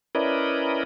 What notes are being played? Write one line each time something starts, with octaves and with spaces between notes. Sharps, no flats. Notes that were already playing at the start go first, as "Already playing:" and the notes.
C#4 E4 A#4 B4 D5 D#5